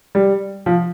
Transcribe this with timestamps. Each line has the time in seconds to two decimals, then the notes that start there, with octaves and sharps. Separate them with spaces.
0.15 G3
0.66 F3